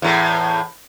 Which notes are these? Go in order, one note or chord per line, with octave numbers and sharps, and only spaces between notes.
E2 A2